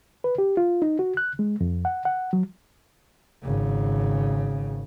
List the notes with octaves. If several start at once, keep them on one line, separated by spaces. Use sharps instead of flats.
B4
G4
F4
D#4
F#4
F#6
G#3
F2
F#5
F#5
F#3
G#1 C#3